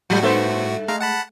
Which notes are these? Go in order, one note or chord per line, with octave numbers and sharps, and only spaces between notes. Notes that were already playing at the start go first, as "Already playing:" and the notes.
A2 F#3 G3 A3 F#4
G2 B3 A4 C5 E5
G#3 A3 F5 A#5
F#5 A5 B5